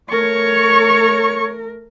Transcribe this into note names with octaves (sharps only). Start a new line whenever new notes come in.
A3 A#4 C#5 C#6